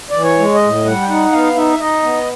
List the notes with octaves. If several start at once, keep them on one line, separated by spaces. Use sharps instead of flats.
E3 D5
C#5
G#3
D#5
A2
G3 F#5
G5
D#4 F#5
B3 F5
D#4 E5
D#4 D#5
B3